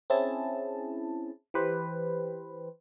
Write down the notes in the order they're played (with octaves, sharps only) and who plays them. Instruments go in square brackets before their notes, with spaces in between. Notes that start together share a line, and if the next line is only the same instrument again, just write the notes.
[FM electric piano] C4 C#4 E4 G#4 A5
E3 G4 B4 C5